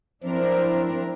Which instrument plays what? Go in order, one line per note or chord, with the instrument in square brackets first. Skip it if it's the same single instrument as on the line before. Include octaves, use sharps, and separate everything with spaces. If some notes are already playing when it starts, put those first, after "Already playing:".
[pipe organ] F3 [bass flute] C4 [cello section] D4 E4 A#4